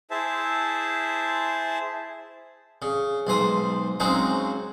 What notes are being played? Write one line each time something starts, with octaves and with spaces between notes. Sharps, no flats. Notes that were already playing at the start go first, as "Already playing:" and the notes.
E4 G#4 C5 E5 A5
C#3
B1 G#2 C5 D#6
C#3 F#3 G#3 C4 D#4